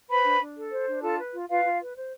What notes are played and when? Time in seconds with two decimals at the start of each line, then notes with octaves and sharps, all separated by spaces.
0.09 B4 C5 B5
0.25 D4
0.41 D4
0.57 A4
0.72 C5
0.88 D4
1.03 F4 A4 A5
1.18 B4
1.34 F4
1.49 F4 B4 F5
1.65 F4
1.81 B4
1.96 C5